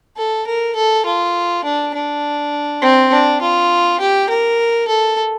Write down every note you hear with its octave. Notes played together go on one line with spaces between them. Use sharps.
A4
A#4
A4
F4
D4
D4
C4
D4
F4
G4
A#4
A4